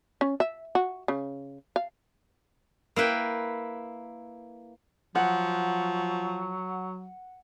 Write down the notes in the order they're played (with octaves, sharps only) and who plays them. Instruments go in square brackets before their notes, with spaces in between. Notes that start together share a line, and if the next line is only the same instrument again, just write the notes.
[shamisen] C#4
E5
F#4
C#3
F5
[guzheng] A#3 E4 B4 G5
[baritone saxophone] F3 [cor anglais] F#3 [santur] F#5